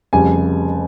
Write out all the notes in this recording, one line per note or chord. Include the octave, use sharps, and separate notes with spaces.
F1 F2 C#3 G3 G#5